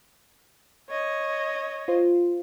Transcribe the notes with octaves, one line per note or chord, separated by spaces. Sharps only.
C#5 D#5
F4 C5